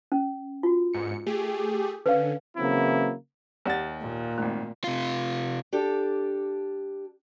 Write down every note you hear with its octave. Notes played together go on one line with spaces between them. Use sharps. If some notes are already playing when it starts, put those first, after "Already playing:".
C#4
F4 F#4
G1 G#2 C#7
A3 G4 G#4
D3 C#4 B4 F5
C#3 E3 F#3 A#3 C4 E4
D#2 G4 D5 F#5 A6
A#2
G#1 D#3 A3
C3 F4
D4 G4 A4